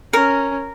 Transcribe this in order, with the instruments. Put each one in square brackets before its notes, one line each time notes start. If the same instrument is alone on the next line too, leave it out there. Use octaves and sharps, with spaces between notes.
[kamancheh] C#4 [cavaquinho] A#4